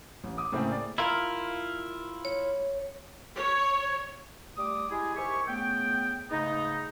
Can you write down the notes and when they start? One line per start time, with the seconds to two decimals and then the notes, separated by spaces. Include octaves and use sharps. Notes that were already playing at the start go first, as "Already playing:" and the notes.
0.24 A1
0.37 D6 D#6
0.52 A2 C#3 A#3 C4 E4 G#4
0.72 D5
0.98 E4 F4 A#4
2.25 C#5
3.36 C#5
4.57 G3 A3 D6 D#6
4.90 G#3 E4 G4 G#4
5.16 D#3 G4 C5 E5 G#5 C#6
5.48 C#3 A3 B3 G5
6.31 G#2 C#3 A3 B3 D#4